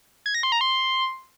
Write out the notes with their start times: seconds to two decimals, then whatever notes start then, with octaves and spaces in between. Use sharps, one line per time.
0.26 G#6
0.35 A#6
0.43 C6
0.52 A#5
0.61 C6